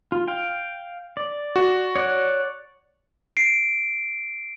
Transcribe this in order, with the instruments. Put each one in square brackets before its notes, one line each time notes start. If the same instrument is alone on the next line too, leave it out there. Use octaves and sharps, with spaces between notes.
[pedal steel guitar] F4
F5 G5
D5
[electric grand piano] F#4
[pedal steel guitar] C#5 D5 F#5
[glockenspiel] C7 D7